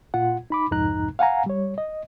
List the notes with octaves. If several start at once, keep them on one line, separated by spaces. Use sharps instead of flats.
A#2 F4 F#5
D#4 B5 D6
C2 F2 G#2 D#4 A#5 F#6
F5 F#5 G#5 A#5
G3 C#5
D#5